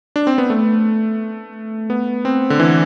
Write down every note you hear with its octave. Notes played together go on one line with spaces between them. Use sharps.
D4
C4
B3
A3
B3
C4
D3
E3